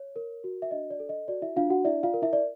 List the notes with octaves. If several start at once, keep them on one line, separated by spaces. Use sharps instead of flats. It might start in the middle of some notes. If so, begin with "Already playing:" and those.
Already playing: C#5
A#4
F#4
E5
D4 D#5
D5
A4
D#5
F#4 D5
E4 E5
D4 F4 F5
F#4 F#5
E4 D5 E5
F4 F5
A#4
E4 E5
D5